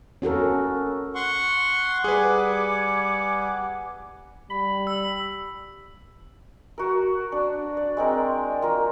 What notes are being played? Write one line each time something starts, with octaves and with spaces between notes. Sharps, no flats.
C#4 F#4 A4 A#4
F#5 C6 C#6
G3 G#4 B4 F#5 G#5 D6
G3 B5
E6
F#4 A#4
D4
D5
G#3 C4 A#4
A#3 F4 A#4